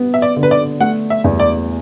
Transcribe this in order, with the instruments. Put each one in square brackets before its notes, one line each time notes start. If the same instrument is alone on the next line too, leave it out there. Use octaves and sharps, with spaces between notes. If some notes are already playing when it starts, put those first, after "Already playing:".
Already playing: [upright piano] B3
[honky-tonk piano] E5
D5
[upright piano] D3
[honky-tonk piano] B4
D5
[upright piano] A3 [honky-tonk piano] F#5
[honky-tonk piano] E5
[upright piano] E2
[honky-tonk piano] D5